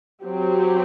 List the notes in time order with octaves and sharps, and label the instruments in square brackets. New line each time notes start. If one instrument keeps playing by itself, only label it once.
[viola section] F#3 C4 G4